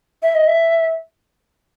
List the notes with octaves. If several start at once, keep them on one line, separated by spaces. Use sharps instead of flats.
E5
D#5
E5